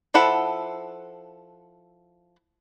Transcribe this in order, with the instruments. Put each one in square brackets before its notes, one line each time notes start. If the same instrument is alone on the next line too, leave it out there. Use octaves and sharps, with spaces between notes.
[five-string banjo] F3 E4 A4 F#5